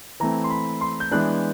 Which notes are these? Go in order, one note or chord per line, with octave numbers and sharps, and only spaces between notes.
E3 A3 C4 A#5
C6
B5
C6
G6
E3 G#3 B3 D4 F#6